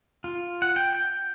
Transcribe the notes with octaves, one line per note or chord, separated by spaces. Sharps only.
F4
F#5
G5
G6